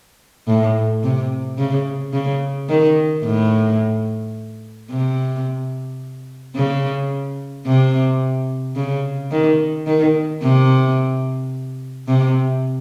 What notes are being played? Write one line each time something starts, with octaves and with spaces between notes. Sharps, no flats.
A2
C3
C#3
C#3
D#3
A2
C3
C#3
C3
C#3
D#3
D#3
C3
C3